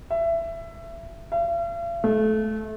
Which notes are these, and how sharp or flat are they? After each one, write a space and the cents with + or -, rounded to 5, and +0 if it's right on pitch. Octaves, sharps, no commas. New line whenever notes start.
E5 +20
F5 -45
A3 -25